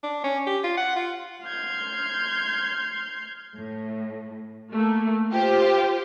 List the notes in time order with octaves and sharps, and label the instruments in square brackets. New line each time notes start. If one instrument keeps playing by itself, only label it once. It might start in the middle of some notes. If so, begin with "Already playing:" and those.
[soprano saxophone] D4
C#4
G4
F4
F#5
F4
[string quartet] C6 F6 G6 G#6
[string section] A2
A3 A#3
F4 G4 C5